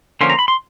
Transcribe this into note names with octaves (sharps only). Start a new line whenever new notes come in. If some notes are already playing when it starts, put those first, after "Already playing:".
D3 F3 A#3 C#4 C6
A#5
B5
C6